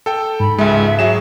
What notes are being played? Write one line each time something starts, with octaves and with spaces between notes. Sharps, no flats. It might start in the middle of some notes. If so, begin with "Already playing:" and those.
A4 G5
G#2 B5
C#2 G#3 E5
F#3 G#4 E5 E7